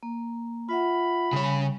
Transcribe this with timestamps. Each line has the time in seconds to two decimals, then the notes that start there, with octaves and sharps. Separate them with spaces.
0.03 A#3
0.69 F4 E5 F#5 B5
1.33 C#3 G3 C#5